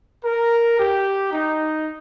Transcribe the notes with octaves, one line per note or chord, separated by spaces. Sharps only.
A#4
G4
D#4